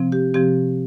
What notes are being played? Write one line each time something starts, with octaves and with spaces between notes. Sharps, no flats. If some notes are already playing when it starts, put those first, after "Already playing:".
Already playing: C3 F3 C4
G4
C3 F3 C4 G4